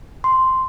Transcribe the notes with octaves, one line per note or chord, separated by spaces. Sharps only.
C6